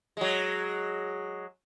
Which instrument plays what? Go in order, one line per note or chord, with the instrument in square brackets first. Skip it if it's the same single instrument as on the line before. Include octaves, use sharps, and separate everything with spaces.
[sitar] F#3 G#3